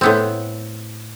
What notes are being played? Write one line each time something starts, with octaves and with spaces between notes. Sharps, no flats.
A2 B3 C4